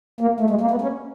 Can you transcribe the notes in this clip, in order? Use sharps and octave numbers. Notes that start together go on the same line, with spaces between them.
A#3
A3
G#3
A#3
B3
C#4